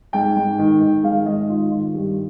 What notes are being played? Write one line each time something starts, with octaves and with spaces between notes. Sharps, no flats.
G#2 G5
G#2
D#3
D#3
G#2 F5
G#2 D#5
D#3 F4
D#3 F4
G2 G4